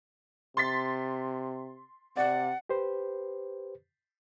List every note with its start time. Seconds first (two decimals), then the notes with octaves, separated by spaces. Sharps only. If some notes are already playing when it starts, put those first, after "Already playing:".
0.57 C3 C6 A6 B6
2.17 C3 D5 F#5
2.69 G4 B4 C5